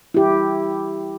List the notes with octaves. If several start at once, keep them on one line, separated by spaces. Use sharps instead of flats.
E4 G4